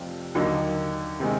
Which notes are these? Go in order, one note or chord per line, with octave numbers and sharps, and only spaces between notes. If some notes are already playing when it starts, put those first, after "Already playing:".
Already playing: F1 F2 C3 F3
D#2 D3 F#3 A#3 D#4
C3 D#3 G#3